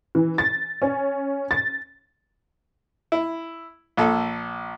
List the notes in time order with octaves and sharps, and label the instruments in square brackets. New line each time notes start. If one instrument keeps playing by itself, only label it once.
[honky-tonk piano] E3
A6
C#4
A6
[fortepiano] E4
A#1 A4